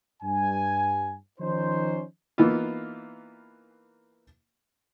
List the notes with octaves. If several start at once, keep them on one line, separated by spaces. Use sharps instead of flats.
G2 G#5
D#3 F3 C#4 D#4 C5
E3 A#3 B3 D#4 F4